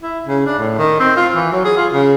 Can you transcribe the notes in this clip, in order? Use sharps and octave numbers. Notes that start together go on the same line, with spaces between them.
E4
C#3
D4
A2
D#3
C4
F4
E3
F#3
G#4
F4
C#3